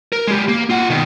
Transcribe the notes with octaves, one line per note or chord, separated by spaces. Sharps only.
A#4
G#3 G4
A#3
F4 F#5
B2 D#3